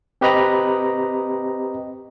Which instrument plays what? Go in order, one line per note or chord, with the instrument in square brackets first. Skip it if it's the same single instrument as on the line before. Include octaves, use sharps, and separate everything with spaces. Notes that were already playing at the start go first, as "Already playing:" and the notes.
[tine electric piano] C4 G4 B4 D#5 A#5 B5